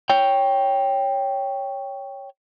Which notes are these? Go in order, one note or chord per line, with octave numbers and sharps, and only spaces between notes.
C#5 G5